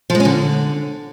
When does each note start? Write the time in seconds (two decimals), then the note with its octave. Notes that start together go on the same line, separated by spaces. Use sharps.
0.10 F3
0.15 G#3
0.20 C#4
0.25 D3